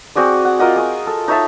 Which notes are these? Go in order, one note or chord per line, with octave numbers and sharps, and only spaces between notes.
C4 F#4 G#4 D5
F#5
F4 A#4 D#5 F#5
G#4 C#6
A4
D#4 C#5 E5 A5